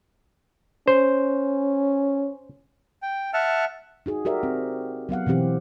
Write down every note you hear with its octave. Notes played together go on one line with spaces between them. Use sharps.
C#4 C5
G5
E5 F#5 A5 F6
D#4 F#4 G#4
F#4 G4 A#4 D5 E5
C4
F#3 B3 F5 F#5
B2 E3 C4 G4